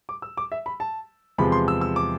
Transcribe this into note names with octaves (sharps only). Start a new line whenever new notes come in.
D6
E6
D6
E5
B5
A5
E2 C3 F3 G#3 B5
C6
E6
E6
D6